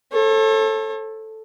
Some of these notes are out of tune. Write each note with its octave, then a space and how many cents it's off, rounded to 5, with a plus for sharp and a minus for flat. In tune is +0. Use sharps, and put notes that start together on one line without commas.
A4 +0 C#5 -40